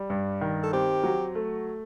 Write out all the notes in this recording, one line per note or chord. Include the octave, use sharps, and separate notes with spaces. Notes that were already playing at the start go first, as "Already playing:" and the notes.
Already playing: G3
G2
D#3
A4
C4 G4
F#3
A3